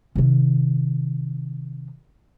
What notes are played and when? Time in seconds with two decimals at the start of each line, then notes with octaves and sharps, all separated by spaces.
0.15 C3 D#3